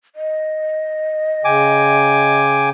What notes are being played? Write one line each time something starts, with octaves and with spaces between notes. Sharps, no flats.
D#5
C#3 G5 G#5 D6